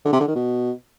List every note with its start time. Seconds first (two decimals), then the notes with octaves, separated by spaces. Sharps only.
0.05 D3
0.13 C3
0.20 D3
0.28 D#3
0.35 B2